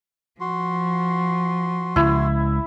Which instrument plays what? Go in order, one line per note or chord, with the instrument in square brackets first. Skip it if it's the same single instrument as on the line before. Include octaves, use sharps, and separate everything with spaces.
[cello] F3 [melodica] F#4 C6
[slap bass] C#2 [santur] E4